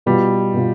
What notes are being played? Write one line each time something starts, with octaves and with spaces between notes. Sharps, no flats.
B2 G3 B3 F4
B2 B3 F4